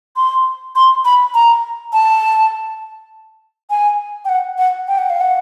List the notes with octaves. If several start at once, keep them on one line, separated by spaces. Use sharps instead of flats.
C6
C6
B5
A#5
A5
G#5
G5
F#5
F#5
G5
F#5
F5
F#5